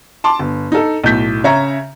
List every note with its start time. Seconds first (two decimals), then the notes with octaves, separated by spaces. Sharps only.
0.24 A5 C6 D6
0.40 G1
0.72 D#4 A4
1.04 B1 A2 G6 B6
1.44 C#3 C#5 E5 A#5